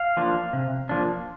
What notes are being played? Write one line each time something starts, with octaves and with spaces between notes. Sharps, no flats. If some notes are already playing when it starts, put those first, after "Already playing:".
Already playing: F5
F3 A#3 D4
C3
F3 A#3 D4